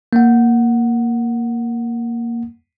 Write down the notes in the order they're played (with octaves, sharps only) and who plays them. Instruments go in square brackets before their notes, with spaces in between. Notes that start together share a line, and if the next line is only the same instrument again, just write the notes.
[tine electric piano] A#3 F#5